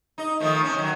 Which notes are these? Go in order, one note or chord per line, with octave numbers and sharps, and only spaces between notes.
D#4 D#5
D#3 F3 A3
C3 C#4
D#3 F#3